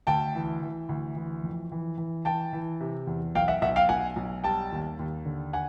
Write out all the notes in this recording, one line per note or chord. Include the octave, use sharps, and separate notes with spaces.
D2 G5 A5
E3
E3
D2
E3
F2
E3
E3
E3 G5 A5
E3
C3
E2
B1 F5 G5
E5 F#5
B1 E5 F#5
F5 G5
B1 F#5 G#5
B1
G3 G5 A5
D#2
D#2
D3
F#5 G#5